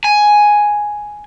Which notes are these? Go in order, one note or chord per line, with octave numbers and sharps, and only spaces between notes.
G#5